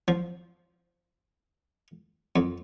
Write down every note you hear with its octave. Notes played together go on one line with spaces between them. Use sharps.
F3
F2